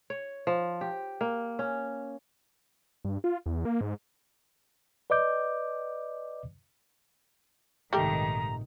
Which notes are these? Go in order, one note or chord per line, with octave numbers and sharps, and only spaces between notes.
C#5
F3
G4
A#3
C#4
G2
F4
E2
A#3
G#2
B4 D5 D#5 D6 G6
A#1 G#2 C3 D#3 G3 A3 G4 A#5